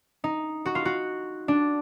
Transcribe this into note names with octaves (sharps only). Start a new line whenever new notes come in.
D#4
F#4
F4
F#4
D4